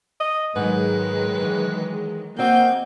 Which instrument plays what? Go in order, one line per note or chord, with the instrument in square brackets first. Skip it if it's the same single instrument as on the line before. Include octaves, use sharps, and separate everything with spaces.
[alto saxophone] D#5
[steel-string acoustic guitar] G#2 [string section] D#3 F#3 G#3 [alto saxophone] B4
[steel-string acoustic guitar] E3
[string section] A#3 G6 [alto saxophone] C4 [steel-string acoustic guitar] F#4 D#5